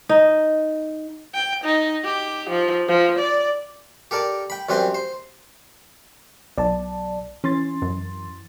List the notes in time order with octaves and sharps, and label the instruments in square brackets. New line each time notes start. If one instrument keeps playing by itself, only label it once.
[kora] D#4
[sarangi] G5
D#4
G4
F3
F3
D5
[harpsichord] G4 A4 A#4 D5
G5 B5
F#2 G3 C4 B4 G5
C5
[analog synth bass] B1 [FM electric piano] D5 A5
[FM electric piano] E3 C6 A6 [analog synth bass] C#4
[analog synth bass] F#2